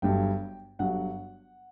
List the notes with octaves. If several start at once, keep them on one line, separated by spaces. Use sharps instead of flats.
G1 G2 F#3 G5
G1 G2 F#3 F#5